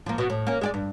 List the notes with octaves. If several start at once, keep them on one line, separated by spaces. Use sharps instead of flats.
F3 A#3
B2
A2
A#3 C#4
G#3 G4 D5
G2